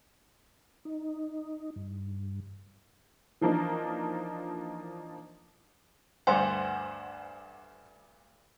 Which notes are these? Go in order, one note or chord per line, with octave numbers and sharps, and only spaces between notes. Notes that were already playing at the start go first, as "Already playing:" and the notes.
D#4
G2
E3 F3 A#3 D4 D#4
D2 G2 G3 C5 F#5 G#5 C6